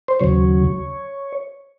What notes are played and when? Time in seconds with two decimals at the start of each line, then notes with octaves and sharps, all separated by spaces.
0.08 C5
0.20 D#2 C#3 F#3 C#5